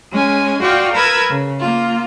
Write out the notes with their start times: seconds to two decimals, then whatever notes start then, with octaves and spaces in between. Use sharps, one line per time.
0.11 G#3 C#4 G#5
0.61 F4 F#4 D5 G5 C#6 F6
0.93 A#4 B4 B5 E6 G#6
1.30 C#3
1.61 A#3 F4